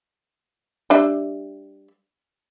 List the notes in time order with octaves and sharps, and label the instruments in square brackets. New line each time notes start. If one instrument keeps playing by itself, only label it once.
[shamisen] G3 D4 E5